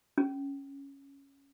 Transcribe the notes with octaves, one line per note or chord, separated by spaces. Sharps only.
C#4